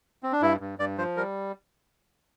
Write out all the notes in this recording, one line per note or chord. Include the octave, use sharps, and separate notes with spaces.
C4
D4
G2 E4
G2
G2 D5
F3 C5
G3 A#4